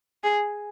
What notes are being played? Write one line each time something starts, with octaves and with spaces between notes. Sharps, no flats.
G#4